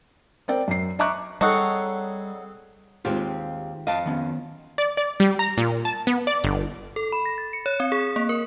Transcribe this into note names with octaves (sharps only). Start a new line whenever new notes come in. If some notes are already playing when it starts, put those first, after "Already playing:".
C4 A#4 D5 G5
F#2 C7
D#5 E5 A#5 C#6 D6 F#6
G3 C4 D#4 G#4 A4 C#5 F#5
D#2 D#3 G#3 C4 F4 G4
F2 D#5 F5 A5
D#3 B3 C#4
D5
D5
G3
A#5
A#2
A5
B3
D5
G1
A4
B5
A#6
A6
C#7
C#5
C4
G#4
A#3
A#4